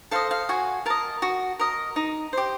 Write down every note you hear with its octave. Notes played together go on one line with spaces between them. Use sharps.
A4 C5 D#5 F5
F5
F#4 G#5
A#4 D#5 A5
F#4
A#4 D#5
D#4
G4 C5